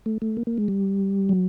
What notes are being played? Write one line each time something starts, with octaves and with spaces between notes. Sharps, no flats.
A3
A3
A#3
A#3
G#3
G3
F#3